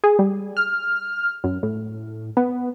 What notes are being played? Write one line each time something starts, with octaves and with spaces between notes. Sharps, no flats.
G#4
G3
F6
F#2
A2
B3